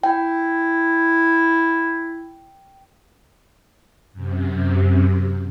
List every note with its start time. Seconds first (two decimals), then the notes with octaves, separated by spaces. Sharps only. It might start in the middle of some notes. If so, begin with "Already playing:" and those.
0.03 E4 G5
4.13 F#2 C3